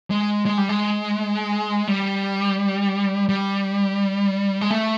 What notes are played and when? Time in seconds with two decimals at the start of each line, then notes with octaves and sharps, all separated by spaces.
0.10 G#3
0.46 G#3
0.58 G3
0.69 G#3
1.87 G3
3.29 G3
4.61 G#3
4.70 A3